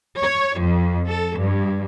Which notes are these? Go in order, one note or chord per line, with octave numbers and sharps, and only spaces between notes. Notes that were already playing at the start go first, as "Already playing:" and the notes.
C#5
F2
A4
G2